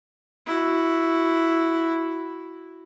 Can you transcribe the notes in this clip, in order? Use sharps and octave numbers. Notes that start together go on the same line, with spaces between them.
E4 F#4